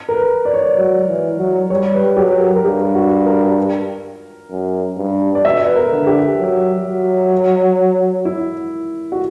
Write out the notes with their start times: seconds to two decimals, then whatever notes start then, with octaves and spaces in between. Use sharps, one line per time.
0.09 A#4
0.14 B4
0.45 D5
0.54 C#5
0.63 D5
0.77 F#3
1.08 E3
1.39 F#3
1.70 G3 C#5
1.94 B4
2.17 F#3 G4
2.40 A#4
2.55 A#4
2.64 G2 G4
2.95 F#4
3.26 A#4
4.51 F#2
4.97 G2
5.35 D5
5.44 B2 E5
5.65 B4
5.76 A#4
5.91 D3
6.07 G4
6.38 F#3
6.85 F#3
8.25 E4
9.12 F#4